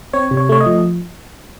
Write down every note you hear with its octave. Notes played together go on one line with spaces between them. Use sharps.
C4 C#5
C3
C#5
A3 C#5
D#5
F3